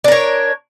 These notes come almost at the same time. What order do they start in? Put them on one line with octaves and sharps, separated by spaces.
D4 A#4 C#5